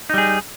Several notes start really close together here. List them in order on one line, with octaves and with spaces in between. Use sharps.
D#4 G3 G#4